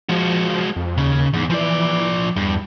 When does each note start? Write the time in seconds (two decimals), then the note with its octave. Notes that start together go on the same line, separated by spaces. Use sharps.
0.09 F3 G#3 F#4
0.76 F2
0.98 D#2 C#3
1.34 E2 G#2
1.50 E3 F3 D5
2.36 E2 G2